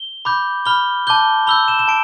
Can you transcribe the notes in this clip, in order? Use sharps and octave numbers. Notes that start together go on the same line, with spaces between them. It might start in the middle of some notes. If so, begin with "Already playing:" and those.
Already playing: G7
B5 D6 G6
B5 F6 G7
A5 D6 G6 G7
B5 E6 G6 G7
E7
E7
A5 D7